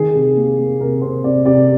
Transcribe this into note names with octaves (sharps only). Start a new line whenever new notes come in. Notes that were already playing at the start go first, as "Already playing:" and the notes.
Already playing: D#3 G#4
C3
A#3
A#3
C3 A#4
C3 C5
C3 D5
C3 D5